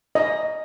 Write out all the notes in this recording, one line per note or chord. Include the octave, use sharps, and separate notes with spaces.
D#5